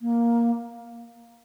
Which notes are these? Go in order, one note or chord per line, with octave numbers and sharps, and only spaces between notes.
A#3